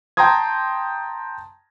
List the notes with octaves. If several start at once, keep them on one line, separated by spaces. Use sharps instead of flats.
G5 A5 A#5 C6 D#6 G#6